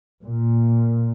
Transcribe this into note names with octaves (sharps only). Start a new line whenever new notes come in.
A#2